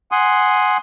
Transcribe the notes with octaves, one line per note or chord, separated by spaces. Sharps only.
F#5 G#5 C6 D#6